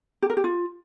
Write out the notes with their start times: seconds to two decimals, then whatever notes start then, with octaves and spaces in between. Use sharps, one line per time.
0.22 G4
0.30 A#4
0.37 G4
0.44 F4